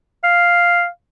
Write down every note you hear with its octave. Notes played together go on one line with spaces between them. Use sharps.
F5